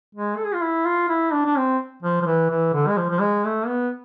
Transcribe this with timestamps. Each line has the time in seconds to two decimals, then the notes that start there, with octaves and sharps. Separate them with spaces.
0.15 G#3
0.37 A4
0.44 G#4
0.54 F4
0.62 E4
0.85 F4
1.09 E4
1.32 D4
1.46 D4
1.56 C4
2.03 F3
2.22 F3
2.26 E3
2.50 E3
2.73 D3
2.88 G#3
2.97 F3
3.10 F3
3.21 G#3
3.44 A3
3.67 B3